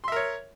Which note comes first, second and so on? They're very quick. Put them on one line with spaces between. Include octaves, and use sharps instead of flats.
C6 E5 A#4 C#5